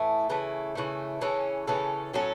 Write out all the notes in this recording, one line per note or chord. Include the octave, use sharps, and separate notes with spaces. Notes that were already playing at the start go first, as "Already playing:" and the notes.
Already playing: A2 E3 A3
C#3 E3 A3
C#3 E3 A3
C#3 E3 C#4 A4
C#3 E3 C#4 A4
A2 F#3 C#4 A4